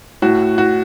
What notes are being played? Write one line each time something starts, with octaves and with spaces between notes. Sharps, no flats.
A2 F#4
F#4